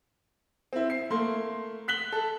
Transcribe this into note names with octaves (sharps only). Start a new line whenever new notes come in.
C4 E4
C7
A3 A#3 C6
F#6 B6 F#7 G7
A4